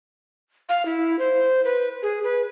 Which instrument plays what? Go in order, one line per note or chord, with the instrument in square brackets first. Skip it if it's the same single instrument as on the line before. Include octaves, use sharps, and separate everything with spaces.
[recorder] F5
E4
C5
B4
G#4
B4